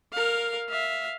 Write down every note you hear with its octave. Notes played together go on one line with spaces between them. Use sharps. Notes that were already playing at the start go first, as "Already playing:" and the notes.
A#4 F5
E5 F5